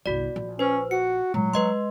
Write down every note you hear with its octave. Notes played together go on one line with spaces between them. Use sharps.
G1 C2 F#4 D5
A#1
C#4 B4 C5
F#4 C#7
A#2 F#3 G#3
G#3 B4 D#5 C6